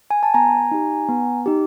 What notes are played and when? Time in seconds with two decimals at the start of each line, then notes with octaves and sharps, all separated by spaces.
0.11 G#5
0.23 A5
0.34 B3 G#5 A#5
0.71 D#4 G4
1.09 B3
1.46 D#4 G4